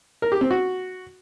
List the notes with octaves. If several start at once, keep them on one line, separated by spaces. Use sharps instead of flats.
A#4
G4
C4
F#4